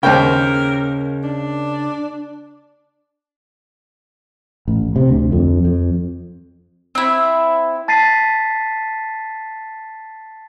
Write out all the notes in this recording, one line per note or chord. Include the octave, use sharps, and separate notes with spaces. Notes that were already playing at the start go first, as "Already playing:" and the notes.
D#2 C#3 A#3 A#4 C5 G5
D4
A1
C3
D2
F2
F2
C4 E4
A5 A6 B6 C7 D#7